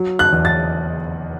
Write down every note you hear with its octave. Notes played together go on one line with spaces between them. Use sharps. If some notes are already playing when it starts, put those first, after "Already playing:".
Already playing: F#3
F#6
E2
A6